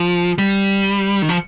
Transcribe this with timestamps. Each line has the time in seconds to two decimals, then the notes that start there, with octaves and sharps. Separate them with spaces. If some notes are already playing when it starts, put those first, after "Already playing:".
Already playing: F3
0.38 G3
1.22 D#3
1.29 F3